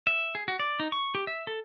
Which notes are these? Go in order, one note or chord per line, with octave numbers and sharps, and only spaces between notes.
E5
G#4
F#4
D5
D#4
C#6
G4
E5
A4